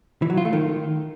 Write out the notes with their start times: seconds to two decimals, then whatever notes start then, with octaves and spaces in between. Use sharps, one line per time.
0.22 E3
0.30 F#3
0.37 F4
0.45 A3
0.53 D#3